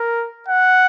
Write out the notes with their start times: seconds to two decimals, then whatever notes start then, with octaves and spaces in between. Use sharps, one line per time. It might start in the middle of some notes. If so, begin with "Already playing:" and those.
Already playing: A#4
0.49 F#5